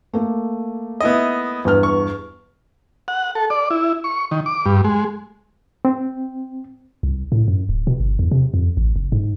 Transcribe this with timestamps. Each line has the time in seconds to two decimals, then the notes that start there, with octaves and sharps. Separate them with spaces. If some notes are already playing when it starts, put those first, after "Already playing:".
0.13 A3 A#3
1.00 B3 E4 D#5
1.65 E2 G2 F6
1.83 C#6
3.08 F#5
3.35 A4
3.50 D5
3.71 E4
4.04 C#6
4.31 D#3
4.46 D6
4.66 G2
4.84 G#3
5.85 C4
7.03 C2
7.32 A2
7.48 F#2
7.69 D1
7.87 B2
8.00 G1
8.19 E2
8.31 C3
8.54 F2
8.77 A1
8.96 F#1
9.12 G#2